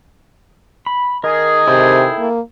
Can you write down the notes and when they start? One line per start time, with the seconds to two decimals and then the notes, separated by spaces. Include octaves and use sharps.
0.86 B5
1.24 D#3 G#4 A#4
1.68 C3 E4 A4 G5
2.19 A#3